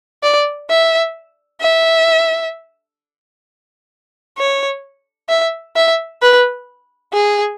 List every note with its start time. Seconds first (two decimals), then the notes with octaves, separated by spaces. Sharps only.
0.23 D5
0.70 E5
1.61 E5
4.38 C#5
5.30 E5
5.76 E5
6.22 B4
7.14 G#4